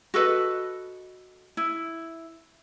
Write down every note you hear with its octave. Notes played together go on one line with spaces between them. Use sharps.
F#4 A4 B4 D#5
E4